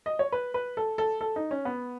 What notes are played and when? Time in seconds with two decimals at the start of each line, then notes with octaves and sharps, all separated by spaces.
0.06 D#5
0.19 C#5
0.32 B4
0.54 B4
0.77 A4
0.98 A4
1.21 A4
1.36 D#4
1.51 C#4
1.65 B3